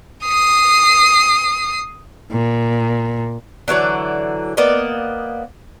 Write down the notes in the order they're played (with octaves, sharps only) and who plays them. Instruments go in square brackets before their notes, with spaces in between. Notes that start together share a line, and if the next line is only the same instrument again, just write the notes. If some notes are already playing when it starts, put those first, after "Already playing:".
[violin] D#6 C7
[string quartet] A#2
[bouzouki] D3 E3 F#3 D5
A#3 B3 D5 D#5